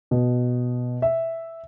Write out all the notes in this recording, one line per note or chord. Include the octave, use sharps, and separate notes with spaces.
B2
E5